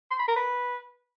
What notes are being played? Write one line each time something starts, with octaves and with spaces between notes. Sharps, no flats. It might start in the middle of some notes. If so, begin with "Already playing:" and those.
C6
B5
A#4
B4